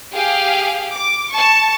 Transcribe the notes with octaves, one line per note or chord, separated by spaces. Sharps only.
G4 G#4 F5
D6
A5 C#6